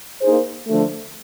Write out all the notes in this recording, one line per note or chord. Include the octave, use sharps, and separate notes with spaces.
A#3 D#4 G#4 C5
D3 F3 A3